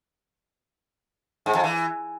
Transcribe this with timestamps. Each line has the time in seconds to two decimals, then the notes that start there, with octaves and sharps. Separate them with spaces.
1.46 G#2
1.55 F2
1.64 E3